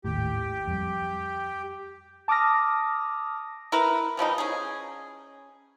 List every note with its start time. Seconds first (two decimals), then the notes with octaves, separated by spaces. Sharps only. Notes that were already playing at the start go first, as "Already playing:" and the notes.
0.05 G#1 D#2 A2 G4
0.68 F2 G3
2.28 A5 D6 D#6 F6 A#6
3.72 E4 A#4 B4
4.17 E3 F3 G3 D#4
4.38 C#4 G#4